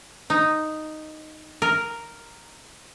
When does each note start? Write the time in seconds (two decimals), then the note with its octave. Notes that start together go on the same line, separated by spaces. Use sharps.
0.30 D#4
1.62 A#4